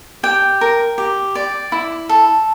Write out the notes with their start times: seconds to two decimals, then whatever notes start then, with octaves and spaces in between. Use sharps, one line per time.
0.23 G4 G5
0.61 A#4
0.98 G4
1.35 D5
1.72 E4
2.09 A4